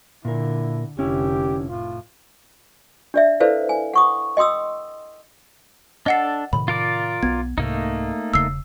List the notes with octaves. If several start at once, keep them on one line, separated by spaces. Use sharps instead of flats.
A#2 D3 E4 A#4
F1 D3 C#4 E4 G4
A2 F4
D4 D5 E5
E4 A4 B4 C5 D5 F5
G#5
F#5 C#6 D#6
D#5 G5 C6 D#6 E6
D4 A4 D#5 F#5 C7
A2 C3 D#3 B5
F4 A#4 D5
B1 B3 G#6
C2 G#2 C3 A3 A#3 D#4
E1 C#3 E6 C7